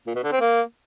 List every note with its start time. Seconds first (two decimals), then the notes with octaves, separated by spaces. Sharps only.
0.07 A#2
0.15 B2
0.24 D3
0.32 C4
0.40 A#3